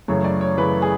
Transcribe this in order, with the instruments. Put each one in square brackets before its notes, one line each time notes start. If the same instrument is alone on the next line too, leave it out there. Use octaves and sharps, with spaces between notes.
[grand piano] F#2 C#3 E3 A3 C#5
D5
C#5
F#2 C#3 E3 A3 B4
G#4